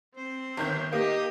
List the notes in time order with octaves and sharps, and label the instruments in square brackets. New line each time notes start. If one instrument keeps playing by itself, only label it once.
[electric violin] C4 [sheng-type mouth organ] C5
[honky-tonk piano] G1 D#3 G6
[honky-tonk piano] A#3 [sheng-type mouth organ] D#4 D#5 D#6 [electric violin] G4